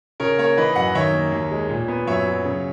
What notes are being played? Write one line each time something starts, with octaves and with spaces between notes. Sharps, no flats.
C#3 A#4 C#5
A#3 A#4 C#5
E3 B4 D#5
F#2 D#5 F#5
D#3 C#5 E5
A#3
D#2
G#3
A#2
B3
F#2 C#5 E5
F#3
C#3